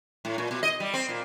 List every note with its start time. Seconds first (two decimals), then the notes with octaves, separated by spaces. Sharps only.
0.25 A2
0.38 A#2
0.51 B2
0.63 D#5
0.80 G3
0.94 C4
1.09 A#2